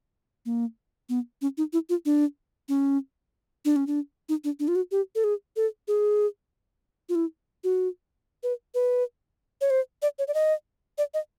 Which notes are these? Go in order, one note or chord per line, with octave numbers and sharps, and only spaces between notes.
A#3
B3
C#4
D#4
E4
F4
D4
C#4
D4
C#4
D4
D#4
D4
D4
F4
F#4
G4
A4
G#4
A4
G#4
F4
E4
F#4
B4
B4
C#5
C5
D5
C#5
D5
D#5
D5
D#5